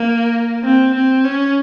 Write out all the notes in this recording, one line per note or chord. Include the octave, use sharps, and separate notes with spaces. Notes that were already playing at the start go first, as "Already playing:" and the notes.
Already playing: A#3
C4
C4
C#4